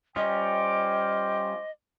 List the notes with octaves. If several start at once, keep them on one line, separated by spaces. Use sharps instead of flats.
G3 C#4 F4 C5 D#5 G5 D6